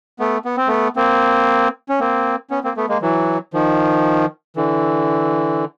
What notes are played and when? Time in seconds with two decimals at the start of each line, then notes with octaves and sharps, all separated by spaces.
0.19 A3 B3
0.45 B3
0.57 C4
0.68 A3 B3
0.96 A#3 C4
1.89 C#4
2.00 A#3 C4
2.50 B3 C#4
2.64 A#3 C4
2.77 A3 B3
2.89 G#3 A#3
3.02 E3 F#3
3.54 D#3 F3
4.56 D3 E3